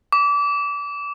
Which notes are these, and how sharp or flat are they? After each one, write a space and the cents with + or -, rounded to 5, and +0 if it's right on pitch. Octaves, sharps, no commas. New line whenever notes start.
D6 -30